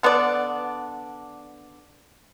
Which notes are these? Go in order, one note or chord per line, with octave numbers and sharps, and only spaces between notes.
D3 B3 D4 D5